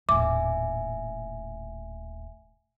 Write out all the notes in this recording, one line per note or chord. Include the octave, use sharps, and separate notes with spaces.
D#1 A2 E5 G#5 D6